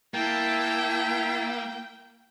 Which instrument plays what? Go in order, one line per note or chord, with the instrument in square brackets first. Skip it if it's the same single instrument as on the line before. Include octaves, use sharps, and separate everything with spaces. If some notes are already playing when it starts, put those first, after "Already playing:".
[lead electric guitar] A#3 [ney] E4 [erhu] G5 [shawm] A5